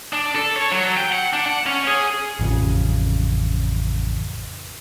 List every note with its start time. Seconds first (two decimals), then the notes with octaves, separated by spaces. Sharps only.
0.13 D4
0.35 A4
0.56 C#5
0.72 F#3
0.97 G5
1.12 F#5
1.33 D4
1.46 F#5
1.66 C#4
1.87 G#4
2.39 A1 F2 C#3